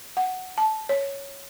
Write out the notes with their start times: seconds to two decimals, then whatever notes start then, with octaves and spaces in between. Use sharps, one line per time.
0.17 F#5
0.58 A5
0.89 C#5